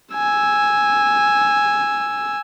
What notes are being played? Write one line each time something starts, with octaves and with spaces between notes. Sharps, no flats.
G#5 E6